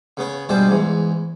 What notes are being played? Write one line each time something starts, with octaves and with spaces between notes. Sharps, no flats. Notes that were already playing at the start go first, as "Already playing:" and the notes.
C#3 B3 C#5
B2 G3 G#3 D4 C5
E2 G#2